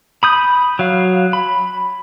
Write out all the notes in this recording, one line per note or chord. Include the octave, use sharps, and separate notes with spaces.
B5 D#6 G6
F#3 F5
B5